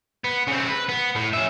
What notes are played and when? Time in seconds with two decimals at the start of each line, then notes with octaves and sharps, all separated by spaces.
0.24 B3
0.47 C#3 C4
0.68 B4
0.89 B3
1.16 A2
1.33 C#4 E5